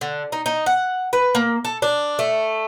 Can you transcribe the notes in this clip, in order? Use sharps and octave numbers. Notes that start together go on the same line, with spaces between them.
D3
D#4
D#4
F#5
B4
A#3
A4
D4
A3